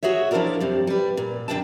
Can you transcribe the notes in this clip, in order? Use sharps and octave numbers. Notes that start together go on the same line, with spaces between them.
F#4 G#4 C#5 E5
F3 D4 E4 A4 A#4 D5
F2 C3 G3
G3 B4
A#2
F#2 D3 D4 E4 G5 A5